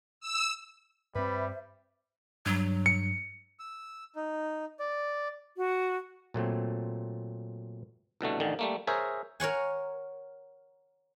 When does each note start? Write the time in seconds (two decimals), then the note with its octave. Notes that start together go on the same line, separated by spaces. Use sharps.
0.20 E6
1.15 G2 G3 C4 B4 C5 E5
2.46 G2 F#3
2.86 C#7
3.59 E6
4.16 D#4
4.79 D5
5.57 F#4
6.34 A#2 F#3 A3 C4
8.21 C2 B2 D3 A3
8.40 A1 D3 D#3
8.59 G3 A3 A#3
8.87 G#4 A#4 C5 C#5 E5
9.40 A#4 C#5 F#5 G#5